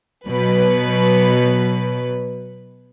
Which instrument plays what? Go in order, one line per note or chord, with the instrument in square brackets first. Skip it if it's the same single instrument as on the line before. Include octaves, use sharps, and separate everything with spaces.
[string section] B2 F#3 B4